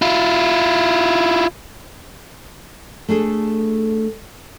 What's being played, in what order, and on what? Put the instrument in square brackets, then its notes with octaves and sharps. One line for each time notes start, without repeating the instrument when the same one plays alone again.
[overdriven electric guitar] E4 F4
[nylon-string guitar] A3 D4 G#4 A4